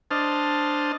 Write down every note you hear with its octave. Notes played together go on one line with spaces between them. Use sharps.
D4 C5 D#5 A5 F6